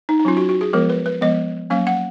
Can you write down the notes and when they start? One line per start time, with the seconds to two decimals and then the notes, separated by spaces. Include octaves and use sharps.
0.09 D#4
0.20 D#4
0.25 F#3 C#4 F4
0.37 F#4
0.49 F#4
0.61 G#4
0.73 F3 G#3 B3 A#4
0.90 B4
1.06 B4
1.21 F3 G#3 B3 D#5
1.70 F#3 A#3 C#4 F5
1.87 F#5